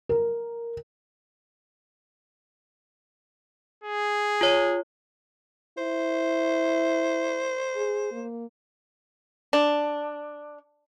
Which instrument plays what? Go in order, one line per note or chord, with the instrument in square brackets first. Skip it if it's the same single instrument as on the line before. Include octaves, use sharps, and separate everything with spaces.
[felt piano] A#4
[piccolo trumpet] G#4
[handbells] F4 C#5
[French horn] E4 [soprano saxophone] C5
[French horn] G#4
A#3
[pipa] D4